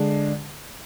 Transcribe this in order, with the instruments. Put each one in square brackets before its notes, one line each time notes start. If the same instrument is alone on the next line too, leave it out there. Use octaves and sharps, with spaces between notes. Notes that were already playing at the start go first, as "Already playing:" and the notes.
Already playing: [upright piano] D3 G#3 D4